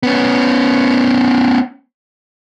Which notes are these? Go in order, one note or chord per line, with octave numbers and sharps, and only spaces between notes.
B3 C#4